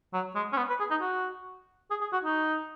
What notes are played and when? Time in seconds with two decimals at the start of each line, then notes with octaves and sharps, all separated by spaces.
0.14 F#3
0.35 G#3
0.53 C#4
0.57 B3
0.69 B4
0.80 G#4
0.91 D#4
1.01 F#4
1.91 G#4
2.01 G#4
2.13 F#4
2.24 D#4